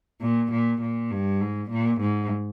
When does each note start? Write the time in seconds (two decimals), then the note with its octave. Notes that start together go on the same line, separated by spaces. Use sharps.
0.21 A#2
0.52 A#2
0.82 A#2
1.11 G2
1.41 G#2
1.70 A#2
2.01 G#2